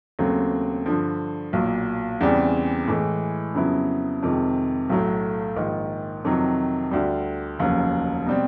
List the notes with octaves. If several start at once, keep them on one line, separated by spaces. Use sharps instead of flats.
D#2 C#3 F#3 A3 C4
G2 D3 F3
B1 A#2 F#3
E2 C#3 E3 G3 C4
A2 E3 G#3
F2 C#3 F#3 B3 E4
F2 C3 D#3 G#3
B1 A2 F#3 A3
A#1 G#2 D#3
F2 C3 D#3 F#3
D2 D3 G3
F1 D#2 C#3 F#3
B2 G3 C4